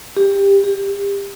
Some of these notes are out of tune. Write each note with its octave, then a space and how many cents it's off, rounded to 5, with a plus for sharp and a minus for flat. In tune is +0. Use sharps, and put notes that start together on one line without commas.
G4 +15
G4 +30